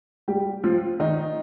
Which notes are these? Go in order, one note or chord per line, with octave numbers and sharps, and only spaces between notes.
G3 G4
F3 F4
D#3 D#4